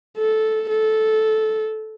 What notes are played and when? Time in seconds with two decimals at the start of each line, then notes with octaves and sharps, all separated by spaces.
0.18 A4
0.69 A4